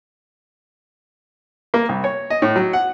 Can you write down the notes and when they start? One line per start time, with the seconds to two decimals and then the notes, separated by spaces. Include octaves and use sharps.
1.74 A#3
1.89 C2
2.04 C#5
2.30 D#5
2.42 A2
2.56 F#3
2.73 F#5